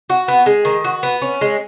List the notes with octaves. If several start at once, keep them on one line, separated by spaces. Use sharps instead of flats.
F#4
B3
G#3
D#3
F#4
B3
C#4
G#3